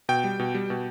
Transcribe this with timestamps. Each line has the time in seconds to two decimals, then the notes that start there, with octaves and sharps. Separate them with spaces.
0.09 B2 G5
0.24 G3
0.39 B2
0.55 G3
0.70 B2